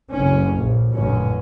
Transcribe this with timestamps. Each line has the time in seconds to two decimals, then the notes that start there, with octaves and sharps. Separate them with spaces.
0.13 F#1 D2 C#4
0.51 A#1
0.91 A1 F#2 A#2 D3 C#4